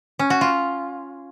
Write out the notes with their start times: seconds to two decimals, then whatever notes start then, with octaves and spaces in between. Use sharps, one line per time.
0.19 C#4
0.30 F#4
0.41 F4